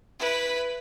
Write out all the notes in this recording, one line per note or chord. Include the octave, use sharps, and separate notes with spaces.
E4 B4